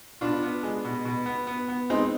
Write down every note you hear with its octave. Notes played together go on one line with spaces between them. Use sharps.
B2 D4 F4
B3
G#3
B2
B2
B3
B3
B3
G#3 C4 D#4